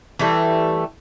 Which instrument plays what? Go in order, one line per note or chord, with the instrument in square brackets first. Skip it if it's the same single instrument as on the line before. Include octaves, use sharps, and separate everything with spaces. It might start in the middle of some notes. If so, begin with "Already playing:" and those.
[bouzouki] E3 G3 A3